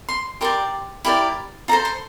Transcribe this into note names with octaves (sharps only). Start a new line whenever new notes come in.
C6
G4 A#4 D5 C6
E4 G4 A#4 D5
F4 A4 C5 A#5
C6